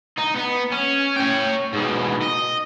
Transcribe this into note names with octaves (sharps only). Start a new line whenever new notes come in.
D#4
B3
C#4
C#5 G5
G#2 B2
D#5